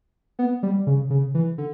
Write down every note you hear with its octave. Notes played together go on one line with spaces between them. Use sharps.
B3
G3
C#3
C#3
E3
D3